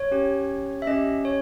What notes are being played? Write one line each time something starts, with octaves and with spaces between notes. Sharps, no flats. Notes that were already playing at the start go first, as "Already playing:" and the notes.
Already playing: C#5
C#4 G4
E5
C#4 G4 D#5
C#5